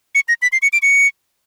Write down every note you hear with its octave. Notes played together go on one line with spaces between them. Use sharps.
C#7
A#6
B6
C7
C#7
D7
C#7